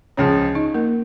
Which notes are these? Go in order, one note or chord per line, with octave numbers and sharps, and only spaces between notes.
C#2 C#3 F3 C#4 C#5
D#4 D#5
A#3 A#4